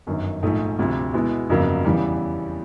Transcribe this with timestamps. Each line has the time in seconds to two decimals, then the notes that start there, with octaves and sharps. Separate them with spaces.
0.07 G1 F#2 D#3
0.43 A#1 G#2 F3 A3
0.79 D2 C3 F3
1.13 B2 G#3 B3 E4
1.49 G1 F2 C#3 F#3 A#3
1.84 E2 C#3 E3 G3